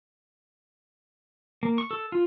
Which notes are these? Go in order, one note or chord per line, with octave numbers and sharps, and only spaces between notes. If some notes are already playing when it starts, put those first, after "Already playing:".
A#3
C#6
A4
F4